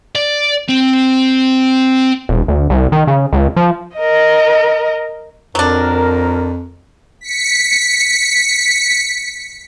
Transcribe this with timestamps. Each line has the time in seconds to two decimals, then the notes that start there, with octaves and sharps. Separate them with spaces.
0.15 D5
0.69 C4
2.29 E1
2.48 D2
2.70 C2
2.92 D#3
3.07 C#3
3.33 C#2
3.56 F3
3.97 A#4 D#5
5.55 F2 F3 F#3 D4 A#4
7.21 B6 C#7